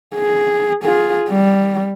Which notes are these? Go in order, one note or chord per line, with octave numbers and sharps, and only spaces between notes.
G#4
F4 G#4
G3